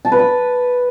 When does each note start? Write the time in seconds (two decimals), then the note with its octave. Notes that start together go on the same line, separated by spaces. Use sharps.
0.05 A5
0.12 B4
0.19 B5